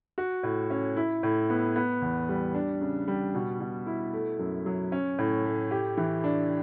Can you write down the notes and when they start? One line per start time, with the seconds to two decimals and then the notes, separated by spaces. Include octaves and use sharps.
0.18 F#4
0.43 A2
0.70 C#4
0.97 E4
1.23 A2
1.50 B3
1.76 B3
2.02 E2
2.29 G3
2.54 D4
2.81 C#3
3.08 G3
3.34 B2
3.60 B2
3.87 E4
4.13 A3
4.39 F#2
4.66 F#3
4.92 C#4
5.18 A2
5.45 A3
5.71 G4
5.97 E3
6.24 D4